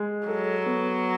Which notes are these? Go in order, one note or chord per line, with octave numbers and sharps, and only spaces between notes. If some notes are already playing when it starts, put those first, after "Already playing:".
Already playing: G#3
F#3 A4
B3